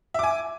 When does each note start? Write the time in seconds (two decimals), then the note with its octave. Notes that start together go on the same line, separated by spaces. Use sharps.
0.14 E5
0.19 D6
0.23 G#5